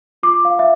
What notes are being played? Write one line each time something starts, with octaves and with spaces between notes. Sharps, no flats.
F4 D6
F5
E5